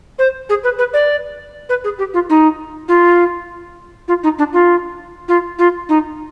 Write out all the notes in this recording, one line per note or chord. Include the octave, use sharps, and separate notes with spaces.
C5
G#4
B4
B4
D5
B4
G#4
G4
F4
D#4
F4
F4
D#4
D4
F4
F4
F4
D#4